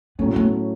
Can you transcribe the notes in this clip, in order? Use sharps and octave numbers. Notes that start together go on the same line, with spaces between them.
A2 F#3 A3 B3 C#4
B3